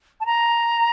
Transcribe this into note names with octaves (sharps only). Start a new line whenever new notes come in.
A5
A#5